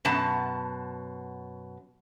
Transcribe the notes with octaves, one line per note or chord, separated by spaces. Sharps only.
F#2 B2 A5